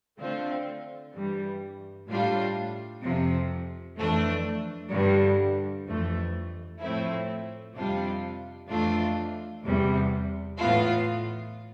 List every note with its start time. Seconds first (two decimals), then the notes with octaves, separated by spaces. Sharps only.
0.18 D3 A3 C4 F4
1.14 G2 E3 G3
2.08 A2 G3 D4 F4
3.02 F2 C3 F3
3.96 F2 E3 A3 D4
4.91 G2 D3 G3
5.85 F2 E3 A3
6.80 A2 F3 A3 C4 E4
7.75 F2 C3 G3 D4 F4
8.69 F2 E3 A3 D4 F4
9.64 E2 C3 G3
10.58 A2 E3 B3 F4